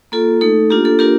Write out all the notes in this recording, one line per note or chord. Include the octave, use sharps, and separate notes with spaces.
A#3 F4 A4
A3 D#4 A4
A#3 D4 F4 G4
A4
A#3 D4 F4 G4 A#4